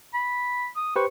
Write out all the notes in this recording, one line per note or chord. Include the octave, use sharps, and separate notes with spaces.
B5
D#6
G4 B4 C5 C#6